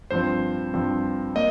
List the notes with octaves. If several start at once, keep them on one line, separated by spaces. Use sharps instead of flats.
G2 F3 C4 C5
G2 F3 C4
A#3 D#5